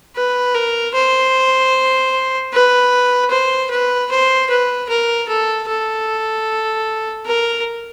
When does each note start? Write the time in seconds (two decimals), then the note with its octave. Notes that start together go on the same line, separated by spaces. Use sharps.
0.16 B4
0.54 A#4
0.94 C5
2.53 B4
3.31 C5
3.70 B4
4.11 C5
4.50 B4
4.89 A#4
5.29 A4
5.68 A4
7.26 A#4